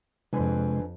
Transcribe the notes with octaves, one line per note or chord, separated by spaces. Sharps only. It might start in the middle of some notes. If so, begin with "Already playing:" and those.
F2 C3 G#3 D4 B4 G#5